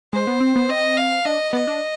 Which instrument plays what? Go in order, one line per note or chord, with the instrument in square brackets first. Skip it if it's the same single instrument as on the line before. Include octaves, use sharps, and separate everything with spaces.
[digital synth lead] G#3 [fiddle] C5
[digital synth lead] B3
C4
B3
[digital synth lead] C4 [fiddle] D#5
[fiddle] F5
[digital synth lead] D4 [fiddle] D#5
[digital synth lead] B3 [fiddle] D#5
[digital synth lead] D4